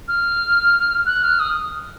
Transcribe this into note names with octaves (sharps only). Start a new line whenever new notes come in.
F6
F#6
F6
D#6